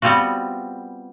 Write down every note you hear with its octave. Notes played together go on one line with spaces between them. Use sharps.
G3 B3 C4 F4 F#4